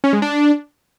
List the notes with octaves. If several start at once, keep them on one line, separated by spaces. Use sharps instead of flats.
C#4
G#3
D4